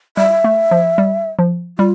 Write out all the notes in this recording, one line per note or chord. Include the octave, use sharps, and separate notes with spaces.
G3 E5
A3
F3
G3
F3
G3 F4